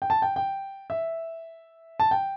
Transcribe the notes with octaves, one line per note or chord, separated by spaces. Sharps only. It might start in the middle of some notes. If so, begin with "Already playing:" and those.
G5
A5
G5
G5
E5
A5
G5